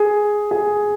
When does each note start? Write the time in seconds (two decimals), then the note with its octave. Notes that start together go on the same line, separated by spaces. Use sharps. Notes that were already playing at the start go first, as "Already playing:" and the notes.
Already playing: G#4
0.51 G#4